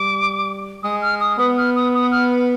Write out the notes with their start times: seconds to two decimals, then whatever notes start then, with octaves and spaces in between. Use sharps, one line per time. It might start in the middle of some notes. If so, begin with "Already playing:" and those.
Already playing: G3 D6
0.83 G#3 D#6
1.02 F6
1.20 D#6
1.38 B3 D#6
1.57 F6
1.75 D#6
1.94 D#6
2.11 F6